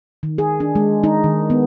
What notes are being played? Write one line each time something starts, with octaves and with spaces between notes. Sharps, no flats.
D#3
G#4
D4
G#3
D#4
D#3
B3